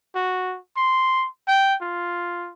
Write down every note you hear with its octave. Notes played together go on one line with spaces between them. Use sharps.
F#4
C6
G5
F4